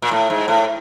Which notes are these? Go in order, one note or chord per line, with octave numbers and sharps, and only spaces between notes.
A#2
A2
G#2
A2